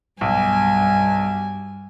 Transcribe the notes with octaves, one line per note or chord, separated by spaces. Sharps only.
B1 G2 G#5